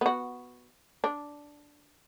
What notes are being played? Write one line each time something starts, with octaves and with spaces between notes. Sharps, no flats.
B3 F#4
D4